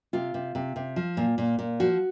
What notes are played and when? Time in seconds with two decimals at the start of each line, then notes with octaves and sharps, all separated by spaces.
0.13 C3 F4
0.34 C3
0.55 C3
0.76 C3
0.96 F3
1.17 A#2
1.38 A#2
1.59 A#2
1.80 F3 F#4